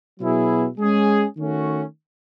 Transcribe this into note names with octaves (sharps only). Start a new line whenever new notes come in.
B2 F#3 B3 E4 G#4
G#3 C#4 G#4
D#3 A3 C#4 F#4